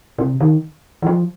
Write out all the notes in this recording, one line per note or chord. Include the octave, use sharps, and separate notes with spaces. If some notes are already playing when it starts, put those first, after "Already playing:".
C3
D#3
E3
F3